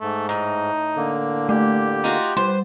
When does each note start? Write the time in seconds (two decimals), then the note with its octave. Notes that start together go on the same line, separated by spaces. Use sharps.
0.01 G#2 A3
0.29 A2 D#4
0.96 D3 A#3
1.49 A3 G4
2.04 D#4 F4 F#4
2.37 G3 B4 C5